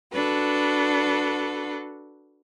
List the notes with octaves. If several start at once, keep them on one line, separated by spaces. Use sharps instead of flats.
D4 F#4 A4 B4